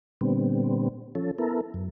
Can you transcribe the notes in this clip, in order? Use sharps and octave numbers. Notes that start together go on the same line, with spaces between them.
A#2 D3 G3 B3 C4
F3 C#4 A4
B3 E4 A4 A#4
F#2